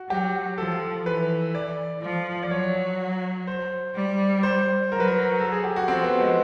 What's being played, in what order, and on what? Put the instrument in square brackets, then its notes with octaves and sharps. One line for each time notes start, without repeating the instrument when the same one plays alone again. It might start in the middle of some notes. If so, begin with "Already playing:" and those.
Already playing: [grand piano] F#4
[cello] F#3 [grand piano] G4
[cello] F3 [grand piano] A4
[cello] E3 [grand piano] B4
[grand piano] D5
[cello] F3
[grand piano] D5
[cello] F#3 [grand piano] C#5
[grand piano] C5
[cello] G3
[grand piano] C5
[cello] F#3 [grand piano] A#4
[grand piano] B4
A#4
A4
G#4
G4
F#4
[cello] F3 [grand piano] C4
[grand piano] B3
G#3